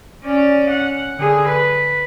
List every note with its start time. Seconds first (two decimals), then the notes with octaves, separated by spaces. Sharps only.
0.25 C#4 D5
0.71 F#5
1.18 D3 G#4
1.49 B4